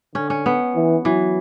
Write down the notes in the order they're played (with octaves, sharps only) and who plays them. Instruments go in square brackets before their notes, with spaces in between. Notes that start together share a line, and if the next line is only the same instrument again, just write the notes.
[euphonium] D3 [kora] C#4
[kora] C#4
B3
[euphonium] E3
[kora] E3 [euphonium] F#3